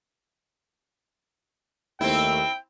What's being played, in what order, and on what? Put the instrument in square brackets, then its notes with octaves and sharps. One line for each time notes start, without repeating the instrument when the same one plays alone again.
[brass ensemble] D#2 D#3 A3 [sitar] C4 E4 [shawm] G5